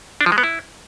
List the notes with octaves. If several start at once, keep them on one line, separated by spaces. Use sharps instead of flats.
D4
F3
G#3
B3
E4